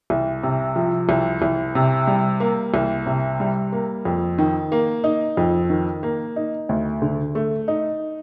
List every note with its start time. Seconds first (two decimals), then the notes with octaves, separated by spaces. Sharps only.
0.10 C2
0.43 C3
0.76 F3
1.09 C2
1.42 C2
1.75 C3
2.07 G3
2.40 A#3
2.74 C2
3.06 C3
3.40 G3
3.72 A#3
4.05 F2
4.38 D#3
4.72 A#3
5.04 D#4
5.37 F2
5.70 D#3
6.03 A#3
6.36 D#4
6.69 D2
7.02 D3
7.35 A3
7.68 D#4